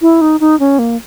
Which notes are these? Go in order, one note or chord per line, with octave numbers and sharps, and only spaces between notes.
E4
D#4
D#4
C#4
A#3